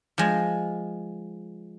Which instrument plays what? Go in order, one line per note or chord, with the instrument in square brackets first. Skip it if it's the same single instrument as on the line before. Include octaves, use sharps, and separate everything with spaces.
[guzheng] F3 G#3